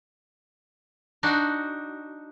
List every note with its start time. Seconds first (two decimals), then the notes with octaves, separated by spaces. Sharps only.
1.23 D4 D#4 F#4